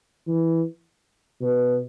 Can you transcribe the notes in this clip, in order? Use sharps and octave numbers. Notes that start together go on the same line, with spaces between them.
E3
B2